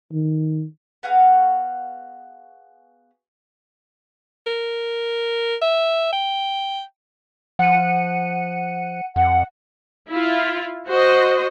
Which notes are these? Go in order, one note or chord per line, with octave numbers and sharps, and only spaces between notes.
D#3
B3 F#4 G#4 F5
A#4
E5
G5
F3 F#5 C#7 D#7
F2 F#5
E4 F4
F#4 C5 D#5